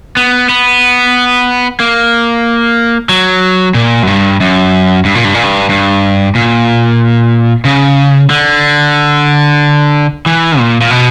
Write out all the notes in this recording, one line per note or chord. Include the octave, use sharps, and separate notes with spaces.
B3
B3
A#3
F#3
A#2
F#2
G2
F#2
G2
A#2
G2
A#2
G2
G2
A#2
C#3
D3
E3
A#2
A#2
B2